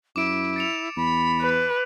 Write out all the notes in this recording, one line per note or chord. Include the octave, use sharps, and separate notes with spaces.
F#2 E4 D6 D7
A6 C#7 F7
E2 B5
B4